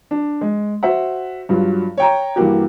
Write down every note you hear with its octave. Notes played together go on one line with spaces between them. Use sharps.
D4
G#3
F#4 C5 E5 F#5
G2 F#3 F4
C#5 G5 A#5
G2 E3 A#3 F#4 G4